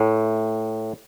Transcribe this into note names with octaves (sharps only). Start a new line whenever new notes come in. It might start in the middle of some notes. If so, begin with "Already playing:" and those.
Already playing: A2